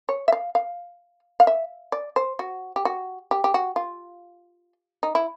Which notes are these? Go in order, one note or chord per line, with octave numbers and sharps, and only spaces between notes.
C#5
E5
F5
F5
F5
E5
D5
C5
F#4
G4
F#4
G4
G4
F#4
F4
D#4
E4